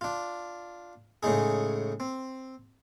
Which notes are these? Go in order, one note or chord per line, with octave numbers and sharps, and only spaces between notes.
D4 F4
A2 C#3 G#3 D#4 G#4
C4